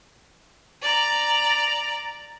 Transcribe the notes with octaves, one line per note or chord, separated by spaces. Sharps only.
D5 A#5